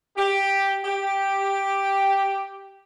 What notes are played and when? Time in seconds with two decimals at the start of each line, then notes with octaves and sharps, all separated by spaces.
0.17 G4
0.84 G4